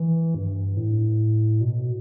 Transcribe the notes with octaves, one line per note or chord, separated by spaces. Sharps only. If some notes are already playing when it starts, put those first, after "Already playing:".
Already playing: E3
G2
A2
B2